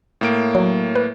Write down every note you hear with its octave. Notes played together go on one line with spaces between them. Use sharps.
A2 A#3 D7
F#3
B4